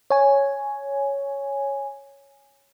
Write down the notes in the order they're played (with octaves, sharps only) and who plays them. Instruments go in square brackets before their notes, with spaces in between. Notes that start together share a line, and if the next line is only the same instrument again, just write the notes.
[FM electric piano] C#5 G#5